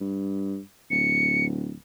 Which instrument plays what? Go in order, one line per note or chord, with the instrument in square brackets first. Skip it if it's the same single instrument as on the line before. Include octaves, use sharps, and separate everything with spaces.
[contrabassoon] G2
[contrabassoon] D1 [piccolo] C#7